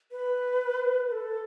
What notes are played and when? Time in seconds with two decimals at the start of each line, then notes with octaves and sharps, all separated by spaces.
0.12 B4
1.07 B4
1.12 A4